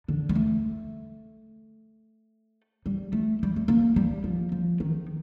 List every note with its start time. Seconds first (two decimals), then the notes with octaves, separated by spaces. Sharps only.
0.08 D3
0.29 G3
0.35 A3
2.86 G3
3.13 A3
3.43 G3
3.56 A3
3.68 A#3
3.96 G3
4.24 F3
4.52 F3
4.80 D#3